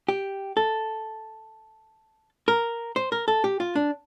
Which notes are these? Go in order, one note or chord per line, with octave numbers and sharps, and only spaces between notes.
G4
A4
A#4
C5
A#4
A4
G4
F4
D4